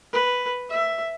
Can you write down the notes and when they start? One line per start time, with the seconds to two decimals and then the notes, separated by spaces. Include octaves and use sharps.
0.13 B4
0.70 E5